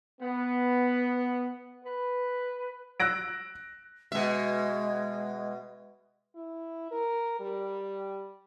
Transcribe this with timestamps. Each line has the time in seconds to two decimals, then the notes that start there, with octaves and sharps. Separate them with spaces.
0.22 B3
1.85 B4
3.00 E6 F#6 A#6 D7
4.12 B2 G#3 E5
6.36 E4
6.91 A#4
7.40 G3